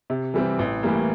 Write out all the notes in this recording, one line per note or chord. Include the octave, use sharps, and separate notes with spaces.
C3
E3 G3 C4
A1
A2 E3 G3 A#3